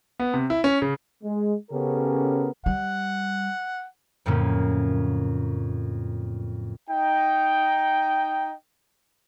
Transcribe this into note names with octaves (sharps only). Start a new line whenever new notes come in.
B3
C3
E4
C#4
C#3
G#3
C#3 B3 C#4 G4 A4 A#4
G3 F#5
F2 A2 C#3 F#3 A#3 C#4
D#4 G5